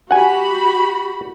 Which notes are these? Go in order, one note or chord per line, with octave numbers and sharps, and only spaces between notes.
F#4 G4 F#5 G#5 B5